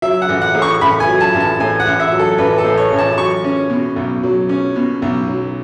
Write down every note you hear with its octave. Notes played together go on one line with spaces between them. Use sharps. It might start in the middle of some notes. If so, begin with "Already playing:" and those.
F#3 E5
F#5
A1
F#5
A2
C#6
A1 B5
G#5
F#3
A5
A1
A5
A2 G#5
F#5
A1
E5
F#3
A4
A1 B4
A4
A2
C#5
A1
A5
F#3 C#6
C#4
B2
B1
F#3
C#4
B2
B1
F#3